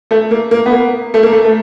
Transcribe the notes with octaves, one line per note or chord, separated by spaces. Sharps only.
A3
A#3
A#3
B3
A#3
A3
A#3
A3
A3